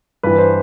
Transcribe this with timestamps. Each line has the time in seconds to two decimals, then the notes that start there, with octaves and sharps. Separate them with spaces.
0.23 G2 E3 B4
0.38 C5